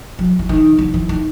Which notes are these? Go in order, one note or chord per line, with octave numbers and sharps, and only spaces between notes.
F#3
E3
D#3
D3
E3
D#3